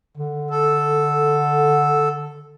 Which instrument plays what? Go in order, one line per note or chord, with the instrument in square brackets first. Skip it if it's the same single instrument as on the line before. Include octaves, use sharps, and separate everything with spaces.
[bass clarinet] D3
[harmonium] A4